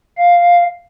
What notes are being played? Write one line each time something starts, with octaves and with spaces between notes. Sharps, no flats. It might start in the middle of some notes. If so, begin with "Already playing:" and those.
F5